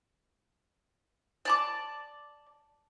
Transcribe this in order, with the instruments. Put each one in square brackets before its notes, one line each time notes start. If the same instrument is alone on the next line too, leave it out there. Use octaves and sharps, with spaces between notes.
[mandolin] D5 A5 D6